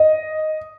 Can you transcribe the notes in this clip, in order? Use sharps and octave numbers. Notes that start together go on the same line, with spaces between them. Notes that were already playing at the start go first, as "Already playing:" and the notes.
Already playing: D#5